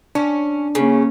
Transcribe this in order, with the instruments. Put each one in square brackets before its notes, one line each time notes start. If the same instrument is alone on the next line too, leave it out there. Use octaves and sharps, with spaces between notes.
[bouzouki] C#4 [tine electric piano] D4
[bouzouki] C#3 [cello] A#3 C#4